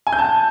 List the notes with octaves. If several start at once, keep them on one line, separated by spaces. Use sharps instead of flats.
G#5
G6
A5